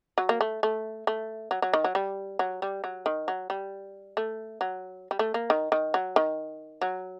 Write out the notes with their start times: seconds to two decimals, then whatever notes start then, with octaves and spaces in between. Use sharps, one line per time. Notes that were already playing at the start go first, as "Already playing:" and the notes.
0.18 F#3
0.29 A#3
0.41 A3
0.63 A3
1.07 A3
1.51 F#3
1.62 F#3
1.73 D#3
1.84 F#3
1.95 G3
2.39 F#3
2.62 G3
2.84 F#3
3.06 D#3
3.28 F#3
3.50 G3
4.17 A3
4.61 F#3
5.11 G3
5.19 A3
5.34 A#3
5.50 D#3
5.72 D#3
5.94 F#3
6.16 D#3
6.81 F#3